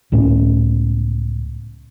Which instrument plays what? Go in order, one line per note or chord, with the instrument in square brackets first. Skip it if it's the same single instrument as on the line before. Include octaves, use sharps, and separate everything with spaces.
[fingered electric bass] C#2 A2 C#4